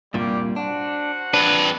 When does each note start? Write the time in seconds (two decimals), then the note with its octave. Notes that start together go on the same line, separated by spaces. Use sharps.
0.14 C2 G2 A#2 G3 F5 D6
0.56 D4 F#4 C5 F#5
1.34 F2 D4 B4